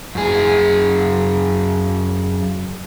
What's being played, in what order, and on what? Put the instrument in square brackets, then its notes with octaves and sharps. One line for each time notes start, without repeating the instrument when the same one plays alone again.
[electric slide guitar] F#2 G#4